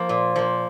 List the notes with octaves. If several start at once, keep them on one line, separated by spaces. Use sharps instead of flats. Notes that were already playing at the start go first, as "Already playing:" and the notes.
Already playing: F3 A#3
A#2
F3 A#3